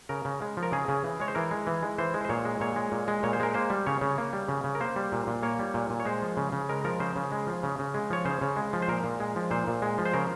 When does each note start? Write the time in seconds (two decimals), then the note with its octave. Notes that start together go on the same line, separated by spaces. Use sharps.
0.09 C#3 A#4
0.25 C#3
0.42 G#3
0.57 F3
0.63 A#4
0.72 C#3 G#4
0.88 C#3
1.03 E3
1.20 G#3 C#5
1.28 C5
1.35 E3 A#4
1.51 G#3
1.67 E3
1.83 G#3
1.98 E3 C5
2.14 G#3
2.25 C5
2.29 A#2 C#5
2.45 G#3
2.60 A#2 C#5
2.76 G#3
2.92 A#2
3.08 G#3
3.23 A#2 C#5
3.33 C5
3.40 G#3 A#4
3.54 A#3 C5
3.70 G3
3.86 C#3 C#5
4.01 C#3
4.18 A#3
4.33 G3
4.48 C#3
4.64 C#3
4.75 A#4
4.80 A#3 C5
4.96 G3
5.12 A#2
5.27 A#2
5.43 A#3 C#5
5.59 G3
5.74 A#2
5.90 A#2
6.00 C#5
6.05 G#3 C5
6.22 F3
6.37 C#3
6.52 C#3
6.69 G#3 A#4
6.84 F3 A#4
7.00 C#3 C5
7.16 C#3
7.32 G#3
7.47 F3
7.63 C#3
7.79 C#3
7.94 G#3
8.10 F3 C#5
8.25 C#3 C5
8.41 C#3
8.56 G#3
8.73 F3
8.82 C5
8.88 A#2 A#4
9.04 A#2
9.20 G#3
9.36 F3
9.51 A#2 C5
9.67 A#2
9.82 G#3
9.98 F3
10.05 C5
10.13 C#3 A#4